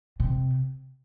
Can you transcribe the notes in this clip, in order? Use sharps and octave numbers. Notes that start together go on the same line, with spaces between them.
C3